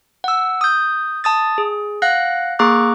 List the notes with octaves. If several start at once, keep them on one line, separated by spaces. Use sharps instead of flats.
F#5 E6
D#6 G6
A5 D#6 A6
G#4
F5 F#5 F#6 A#6
A#3 G#4 A#5 C#6 D6 F#6